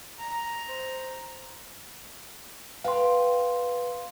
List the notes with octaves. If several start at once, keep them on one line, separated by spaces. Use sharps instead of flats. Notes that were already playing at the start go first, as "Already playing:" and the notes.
A#5
C5
B4 F5 G5 A#5 C6